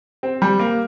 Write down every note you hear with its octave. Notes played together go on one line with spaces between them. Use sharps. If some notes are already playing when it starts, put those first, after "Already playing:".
C4
G3
A#3